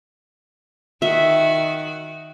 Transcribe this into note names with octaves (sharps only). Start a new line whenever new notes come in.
D#3 F#4 E5